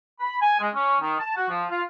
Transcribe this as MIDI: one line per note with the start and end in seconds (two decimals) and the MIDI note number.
0.20 0.39 83
0.42 0.58 80
0.60 0.69 56
0.74 0.96 61
1.01 1.18 51
1.19 1.33 81
1.36 1.49 66
1.49 1.64 53
1.70 1.82 65